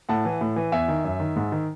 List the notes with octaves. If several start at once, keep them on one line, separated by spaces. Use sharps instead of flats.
A2 F#5 A5
E3
A2
E3
E2 E5 G#5
D#3
F#2
D#3
G#2
D#3